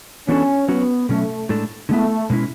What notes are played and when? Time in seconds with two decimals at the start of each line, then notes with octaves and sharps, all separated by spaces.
0.28 E3 B3 C#4 D4 F#4 A4
0.68 F#3 B3 C#4 F#4
1.09 B2 F#3 A3 C#4
1.49 A2 G#3 D4 A4
1.89 D3 G#3 A3 B3 E4
2.30 B2 G#3 C#4 E4